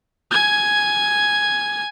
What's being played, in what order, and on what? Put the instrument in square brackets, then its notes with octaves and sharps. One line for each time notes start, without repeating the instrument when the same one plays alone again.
[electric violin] G#5 G#6